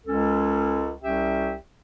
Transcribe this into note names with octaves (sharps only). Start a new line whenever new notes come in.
C#2 G#3 C#4 A4
C2 C#4 G4 E5 G5